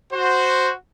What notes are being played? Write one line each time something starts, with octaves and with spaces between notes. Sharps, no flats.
F#4 C5